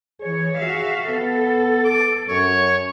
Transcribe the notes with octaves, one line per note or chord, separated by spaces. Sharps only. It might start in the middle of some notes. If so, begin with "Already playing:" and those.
E3 G#4 C#5
F#4 E5 F5
B3 A4
D6
F#2 C#5